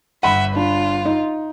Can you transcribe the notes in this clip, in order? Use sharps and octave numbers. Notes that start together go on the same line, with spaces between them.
G1 E5 F#5 B5 D#7
D4 F4
D#4